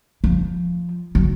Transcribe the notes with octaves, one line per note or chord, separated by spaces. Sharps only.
F3
F#3